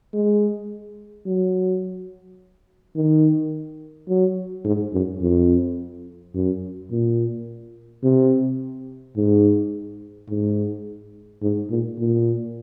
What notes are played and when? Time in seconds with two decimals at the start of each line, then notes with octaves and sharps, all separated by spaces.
0.14 G#3
1.26 F#3
2.96 D#3
4.09 F#3
4.65 G#2
4.93 F#2
5.21 F2
6.34 F#2
6.91 A#2
8.04 C3
9.16 G#2
10.30 G#2
11.42 G#2
11.70 A#2
11.99 A#2